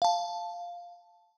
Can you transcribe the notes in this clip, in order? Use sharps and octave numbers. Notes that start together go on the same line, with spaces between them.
F5 A5